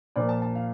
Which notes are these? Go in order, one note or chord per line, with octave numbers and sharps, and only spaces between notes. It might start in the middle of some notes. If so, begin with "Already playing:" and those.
A#2 F3 A#3 D5
A5
A5
F5